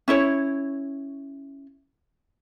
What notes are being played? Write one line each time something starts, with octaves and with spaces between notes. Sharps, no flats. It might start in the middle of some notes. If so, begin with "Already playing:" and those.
C#4 E4 C#5